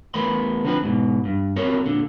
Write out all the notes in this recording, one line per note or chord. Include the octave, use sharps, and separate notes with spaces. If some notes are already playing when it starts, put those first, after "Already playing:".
E3 A3 B3 A#4 B5 C6
D3 F3 C4 D4 B4
G#2 B2
G2
C4 E4 F#4 A4 A#4 C#5
A#2 D3